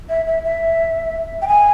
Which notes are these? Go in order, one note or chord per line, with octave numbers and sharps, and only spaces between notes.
E5
E5
E5
G5
G#5